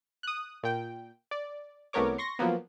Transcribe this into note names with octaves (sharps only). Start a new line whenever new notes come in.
D#6 F#6
A#2 G5
D5
C2 A3 B3 A#4 C#5 D6
C6 C#6 A#6
F3 F#3 A#3 B3